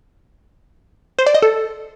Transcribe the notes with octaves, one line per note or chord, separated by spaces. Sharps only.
C5
D5
D#5
A4